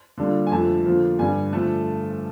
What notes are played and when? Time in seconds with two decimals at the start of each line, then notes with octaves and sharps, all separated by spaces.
0.18 D3 G3 A#3 D4 F4
0.47 G#5
0.52 F2 D3 F3 A3 A5
0.85 D3 F3 A#3
1.19 G2 D3 G3 G#5
1.52 D3 F3 A3 A5